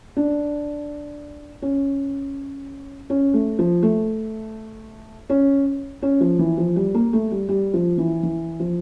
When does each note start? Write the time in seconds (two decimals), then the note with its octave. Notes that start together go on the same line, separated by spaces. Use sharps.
0.17 D4
1.62 C#4
3.10 C#4
3.34 A3
3.59 F3
3.83 A3
5.30 C#4
6.02 C#4
6.21 F3
6.39 E3
6.58 F3
6.76 G3
6.94 A#3
7.13 A3
7.32 G3
7.49 G3
7.74 F3
7.98 E3
8.23 E3
8.60 F3